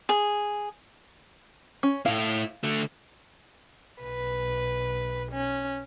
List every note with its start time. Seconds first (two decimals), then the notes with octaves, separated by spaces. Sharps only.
0.09 G#4
1.83 C#4
2.06 A2 E4 F5
2.64 D3 A3
4.03 B1 B4
5.32 C#4